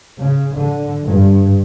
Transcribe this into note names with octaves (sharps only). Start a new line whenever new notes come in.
C#3
D3
G2